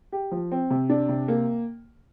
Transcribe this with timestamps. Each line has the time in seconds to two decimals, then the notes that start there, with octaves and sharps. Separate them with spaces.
0.12 G4
0.31 F3
0.52 C4
0.70 C3
0.90 D4
1.09 C3
1.28 A#3